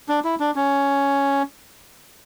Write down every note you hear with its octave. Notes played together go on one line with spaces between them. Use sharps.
D4
E4
D4
C#4